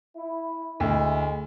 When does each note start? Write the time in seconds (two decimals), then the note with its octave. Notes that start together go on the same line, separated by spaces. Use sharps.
0.16 E4
0.80 D2 G#3 E4